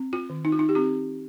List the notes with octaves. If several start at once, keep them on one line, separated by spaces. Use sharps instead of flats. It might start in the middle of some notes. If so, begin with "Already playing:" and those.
Already playing: C4
F4
D#3
D#4
F4
D#4
G4
C4 F4